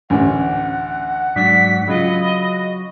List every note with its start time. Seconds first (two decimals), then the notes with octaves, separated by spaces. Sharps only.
0.10 A1 D2 C#4 F#5
1.36 G#2 F#3 D4 B6
1.88 C#3 F#3 F4 D#5 B5